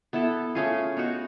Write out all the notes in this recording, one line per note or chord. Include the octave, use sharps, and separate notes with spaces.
B3 E4 A4
A3 C#4 F4 G#4
B3 D#4 F#4